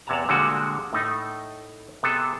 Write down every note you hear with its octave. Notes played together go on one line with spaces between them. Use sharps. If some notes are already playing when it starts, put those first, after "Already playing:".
E2 C3 C#5 F#5 A5 A#5
A#2 D3 G3 G#3 F#4
A2 A3 D#4
C3 B3 G#4 A4